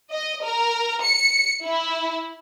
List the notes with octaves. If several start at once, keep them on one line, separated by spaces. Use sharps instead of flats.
D#5
A#4
C#7
E4